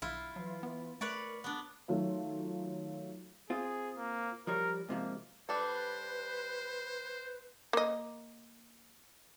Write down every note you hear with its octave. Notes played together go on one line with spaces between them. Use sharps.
B1 E4 F4
E3 F#3
B3
A3 A#4 B4 C#5 D5
B3 D4
D#3 F#3 A3 F4
C4 F4 G#4
A#3
F3 G3 A#4 C#5
G#2 C3 F3 A#3
G3 D4 A4 B4 C5
A#3 D#5